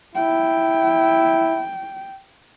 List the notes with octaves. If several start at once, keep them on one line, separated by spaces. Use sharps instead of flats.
E4 G5